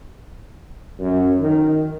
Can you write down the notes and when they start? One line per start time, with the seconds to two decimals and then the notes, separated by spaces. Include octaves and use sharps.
0.99 F#2
1.40 D#3